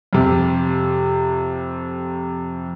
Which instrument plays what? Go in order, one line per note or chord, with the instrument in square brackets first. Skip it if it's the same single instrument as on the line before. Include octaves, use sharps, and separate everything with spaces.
[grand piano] F2 C3